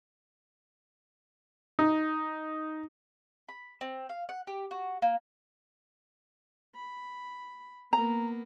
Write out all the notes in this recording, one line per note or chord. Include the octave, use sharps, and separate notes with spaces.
D#4
B5
C4
F5
F#5
G4
F#4
A#3
B5
A#3 B3 A#5